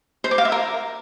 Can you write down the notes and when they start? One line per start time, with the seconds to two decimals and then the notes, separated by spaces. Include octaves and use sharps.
0.24 C5
0.31 D6
0.38 F5
0.45 E5
0.52 A#4